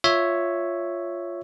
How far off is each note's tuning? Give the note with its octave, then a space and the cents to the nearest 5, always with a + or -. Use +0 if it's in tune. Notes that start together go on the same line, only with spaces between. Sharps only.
F4 +0 C#5 +0 E5 +0